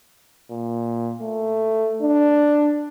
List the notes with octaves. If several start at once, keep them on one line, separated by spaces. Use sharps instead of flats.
A#2
A3
D4